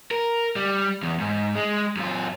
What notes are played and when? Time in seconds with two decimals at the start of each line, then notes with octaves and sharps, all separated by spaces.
0.11 A#4
0.56 G3
1.03 E2
1.20 G#2
1.56 G#3
1.97 F#2 F4